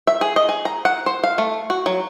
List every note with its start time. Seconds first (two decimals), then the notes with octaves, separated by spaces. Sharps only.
0.07 E5
0.21 G#4
0.36 D#5
0.49 G#4
0.65 A#5
0.85 F#5
1.06 C5
1.24 F5
1.38 A3
1.70 F#4
1.86 F#3